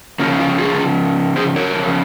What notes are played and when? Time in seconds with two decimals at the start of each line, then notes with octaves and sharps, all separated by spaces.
0.19 C#3 F3 A#3 C#4
0.39 C#4 F4
0.58 F4 G#4
1.36 G#4 C5
1.56 A#4 C#5
1.75 C#3 F3